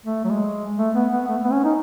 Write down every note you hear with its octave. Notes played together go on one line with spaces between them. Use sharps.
A3
F#3
G#3
A3
B3
B3
A3
B3
C#4
D#4